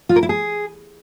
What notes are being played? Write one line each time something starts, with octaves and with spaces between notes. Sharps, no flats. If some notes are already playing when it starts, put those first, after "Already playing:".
F4
A#4
E4
G#4